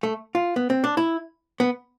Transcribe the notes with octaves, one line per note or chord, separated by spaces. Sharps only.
A3
F4
B3
C4
D4
E4
B3